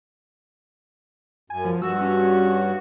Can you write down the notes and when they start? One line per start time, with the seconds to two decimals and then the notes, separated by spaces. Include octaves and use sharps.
1.50 F#2 G#5
1.65 F3
1.82 G2 F#4 E6
2.01 C#4